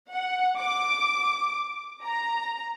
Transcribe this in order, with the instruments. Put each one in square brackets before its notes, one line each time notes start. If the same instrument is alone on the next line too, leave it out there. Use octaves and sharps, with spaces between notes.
[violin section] F#5
D6
A#5